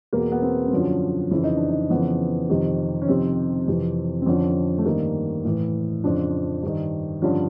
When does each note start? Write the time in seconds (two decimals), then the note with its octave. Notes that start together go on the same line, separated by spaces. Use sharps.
0.13 E2 B2 A#3
0.32 B3
0.42 C4
0.68 C4
0.72 F#2 D3 F3 C#4
1.31 F2 C#3 E3 E4
1.44 D#4
1.57 D4
1.70 D#4
1.90 F2 C#3 E3 B3
2.50 F2 C3 D#3
3.02 C#4
3.08 F2 C3 D#3 C4
3.67 F2 C3 E3
4.22 C4
4.26 F2 D3 F3 C#4
4.78 A3
4.85 G2 D#3 A#3
5.45 A2 E3
6.04 F2 C#3 F3 D4
6.63 G2 D#3
7.22 G2 D3 F3 C#4